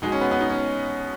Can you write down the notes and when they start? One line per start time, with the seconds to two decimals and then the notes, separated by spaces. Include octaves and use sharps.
0.02 B2 G#3 D#4
0.12 C#4
0.21 B3
0.31 B3
0.40 D#4
0.49 C#4